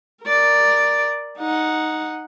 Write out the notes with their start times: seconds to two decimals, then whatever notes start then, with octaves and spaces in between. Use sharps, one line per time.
0.25 A#4 D5
1.38 D#4 F#5